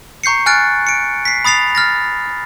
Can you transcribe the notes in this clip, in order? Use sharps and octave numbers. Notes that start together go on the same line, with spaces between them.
A#5 C#6 G6 C7 C#7
G#5 F6 F#6 A6 D7
C#7 D7
B6 C7
B5 D#6 A6 C7 F7
F6 A6 A#6